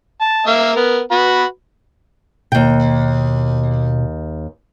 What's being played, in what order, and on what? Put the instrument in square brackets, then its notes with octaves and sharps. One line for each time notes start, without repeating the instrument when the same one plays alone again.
[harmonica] A5
A#3 E5 F5
B3 A#4
F#4 B4 B5
[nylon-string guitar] D#2 G5 [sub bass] B2